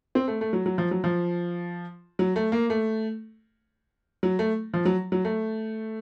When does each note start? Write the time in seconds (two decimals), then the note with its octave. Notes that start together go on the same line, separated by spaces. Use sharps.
0.15 C4
0.28 A3
0.41 A3
0.53 F#3
0.66 F#3
0.78 F3
0.91 F#3
1.04 F3
2.19 F#3
2.36 A3
2.52 A#3
2.70 A3
4.23 F#3
4.39 A3
4.74 F3
4.85 F#3
5.12 F#3
5.25 A3